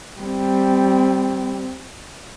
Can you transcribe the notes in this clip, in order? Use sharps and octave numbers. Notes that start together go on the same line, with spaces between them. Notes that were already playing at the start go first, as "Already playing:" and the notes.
G3 C4